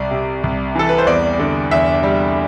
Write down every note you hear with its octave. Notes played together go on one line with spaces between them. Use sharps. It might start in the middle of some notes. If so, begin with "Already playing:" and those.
Already playing: C2 D5
C3
C2
E3 A4
B4
C5
E2 D5
D3
E2 E5
G3